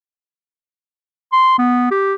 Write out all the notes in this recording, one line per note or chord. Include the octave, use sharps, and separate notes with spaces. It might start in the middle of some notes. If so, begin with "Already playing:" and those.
C6
B3
G4